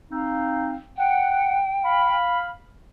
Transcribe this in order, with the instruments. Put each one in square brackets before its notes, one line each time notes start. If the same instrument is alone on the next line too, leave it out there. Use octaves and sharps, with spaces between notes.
[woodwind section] C4 D#4 F5
[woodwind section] F#5 [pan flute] G5
[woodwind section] F5 B5